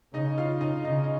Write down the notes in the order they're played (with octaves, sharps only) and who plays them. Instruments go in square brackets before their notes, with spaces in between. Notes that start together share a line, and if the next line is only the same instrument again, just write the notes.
[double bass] C#3 [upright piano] D#4 D#5
[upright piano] F4 F5
D#4 D#5
[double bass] C#3 [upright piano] D#4 D#5
[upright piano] D#5